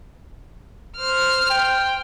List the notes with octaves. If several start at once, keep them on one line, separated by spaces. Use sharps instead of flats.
C5 F6
G5